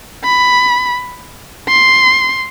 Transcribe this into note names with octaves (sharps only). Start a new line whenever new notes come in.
B5
C6